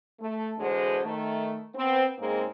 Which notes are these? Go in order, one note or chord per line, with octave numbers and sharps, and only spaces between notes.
A3
E2 B2 D3 G#3 C5
D#3 A3
B3 C4
G#2 C#3 G#3 A#3 C4